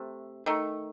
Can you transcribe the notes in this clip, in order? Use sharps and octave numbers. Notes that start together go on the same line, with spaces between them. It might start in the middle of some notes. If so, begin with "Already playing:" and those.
Already playing: C3 A3
D#3 A3